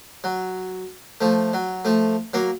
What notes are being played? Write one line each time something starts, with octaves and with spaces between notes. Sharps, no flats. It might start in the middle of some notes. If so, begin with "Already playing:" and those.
F#3
F3 A3
F#3
F3 A3
F#3 A#3